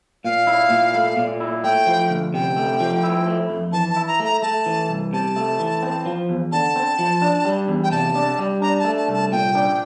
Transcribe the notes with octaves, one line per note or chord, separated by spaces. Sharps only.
A#2 F5
E4
A#2
A3
A#2
E4
A3 G5
F3
D2
C3 G5
A3
F3
E4
A3
F2
E3 A5
A5
E4
A#5
A3
A#5
A3 A5
E3
C2
C3 A5
A3
E3
C4
F3
E2
D3 A5
C4
F3
D4
G3
E2
G5
C3 A5
D4
G3
D4 A#5
A5
A3
A5
C2
A5
A#2 G5
D4